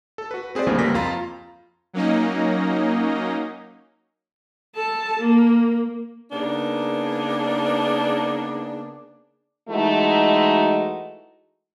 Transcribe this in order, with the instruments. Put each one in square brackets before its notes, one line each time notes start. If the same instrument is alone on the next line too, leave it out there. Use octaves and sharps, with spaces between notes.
[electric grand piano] A4
F#4 B4
C4 G#4 B4 C5 D5
D2 G2 C#3 E3 F3 A#3
C#2 F3 G3 A#3 A#6 B6
F2 F4 A#5
[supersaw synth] F#3 A#3 C#4 D#4 D#5
[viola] A4 A5
A#3
[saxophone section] C#3 A#3 B3 D4 D#4 G#4
[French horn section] E3 G#3 A3 D#4 F#4